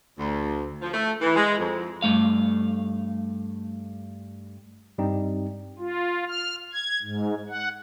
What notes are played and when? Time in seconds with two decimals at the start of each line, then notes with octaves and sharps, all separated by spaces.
0.18 D2
0.82 F3
0.94 A3
1.21 E3
1.36 G#3
1.58 F2
2.02 G2 A3 F5
4.98 G2 G3 C4 D#4 G5
5.79 F4
6.29 F6
6.73 G#6
7.02 G#2
7.49 F#5